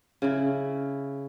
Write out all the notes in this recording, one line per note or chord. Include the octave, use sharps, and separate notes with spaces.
C#3 E4